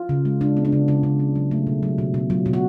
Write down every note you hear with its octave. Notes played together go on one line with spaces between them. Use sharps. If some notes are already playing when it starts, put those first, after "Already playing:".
Already playing: F4
C#3
G#3
G#3 D4
B3
D4
C#3
C#3 F4
C#3
B3
F#3
A3
B2
F#3
B2
B2
F#3 F4
B2
F#4